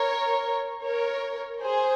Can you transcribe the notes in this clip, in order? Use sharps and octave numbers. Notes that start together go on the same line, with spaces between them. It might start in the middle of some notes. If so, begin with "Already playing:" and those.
Already playing: A#4 C#5
A#4 C#5
G#4 C5